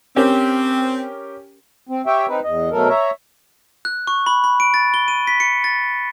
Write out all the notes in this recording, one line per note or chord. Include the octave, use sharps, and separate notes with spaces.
C4 C#4 G4 A#4
C4
G4 C#5 E5 G5
C4 D#4 B4
E2 D#5
B2 F#3 A3 A4 A#4
C#5 E5 A#5
F#6
C#6
B5
B5
D7
A6
G7
D#7
B6
C#7
A6